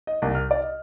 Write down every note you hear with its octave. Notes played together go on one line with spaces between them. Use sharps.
D#5
C2
F6
D5
D#5